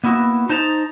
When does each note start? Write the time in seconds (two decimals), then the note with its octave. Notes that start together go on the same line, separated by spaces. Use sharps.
0.04 A#3 B3 E4 F#4
0.49 D#4 C5 A5 A#5